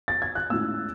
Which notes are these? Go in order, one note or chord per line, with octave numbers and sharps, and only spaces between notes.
A6
G#6
F#6
A2 G#3 C#4 E4 E6